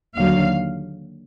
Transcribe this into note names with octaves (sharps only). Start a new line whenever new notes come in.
D#2 D3 F#3 F5